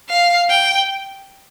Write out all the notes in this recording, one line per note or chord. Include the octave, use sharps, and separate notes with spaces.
F5
G5